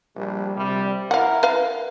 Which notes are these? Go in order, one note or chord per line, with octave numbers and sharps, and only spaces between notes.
A#1 G3
C3 G3
E4 A#4 F5 F#5
B4 F5